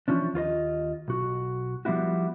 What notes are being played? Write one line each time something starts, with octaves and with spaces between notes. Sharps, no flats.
E3 F3 C#4 D4
D#2 F4 C5 D#5
B1 F#4
F3 G3 B3 E4 F#4